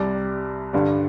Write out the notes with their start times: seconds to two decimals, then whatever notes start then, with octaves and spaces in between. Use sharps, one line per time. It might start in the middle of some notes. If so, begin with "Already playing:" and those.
Already playing: C2 C3 G3 D5
0.73 G2 D3 G3